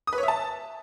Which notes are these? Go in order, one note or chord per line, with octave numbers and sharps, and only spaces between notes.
D#6
B4
C#5
E5
A5